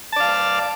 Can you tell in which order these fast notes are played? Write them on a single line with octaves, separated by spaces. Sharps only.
A5 D5 F5